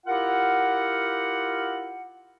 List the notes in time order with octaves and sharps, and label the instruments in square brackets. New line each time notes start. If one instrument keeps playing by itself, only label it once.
[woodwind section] E4 F4 G4 A#4 F#5